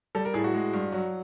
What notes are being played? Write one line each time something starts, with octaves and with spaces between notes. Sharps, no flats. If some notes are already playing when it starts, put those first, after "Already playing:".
G3 A4
A#4
A2 G#4
F#4
G#3
G2
F#3